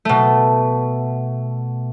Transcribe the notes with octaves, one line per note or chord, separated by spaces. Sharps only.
B2 A3